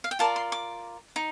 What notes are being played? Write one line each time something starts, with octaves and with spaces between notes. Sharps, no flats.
F5
G5
F4 A#4 D5 A5
C6
D6
D#4